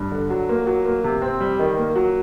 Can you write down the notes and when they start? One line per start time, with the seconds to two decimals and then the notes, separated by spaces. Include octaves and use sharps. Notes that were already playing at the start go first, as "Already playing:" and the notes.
Already playing: G2
0.12 D3
0.30 F#3
0.49 A#3
0.67 F#3
0.85 A#3
1.04 C3
1.22 C4
1.40 G3
1.59 D#3
1.77 A#3
1.95 F#3